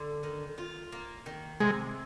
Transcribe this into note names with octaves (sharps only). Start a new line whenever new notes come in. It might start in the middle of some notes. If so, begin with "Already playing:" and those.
Already playing: D3
D#3
F4
A#3
D#3
C3 G#3